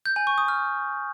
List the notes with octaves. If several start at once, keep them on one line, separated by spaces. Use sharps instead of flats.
G6
G#5
C#6
D#6
F6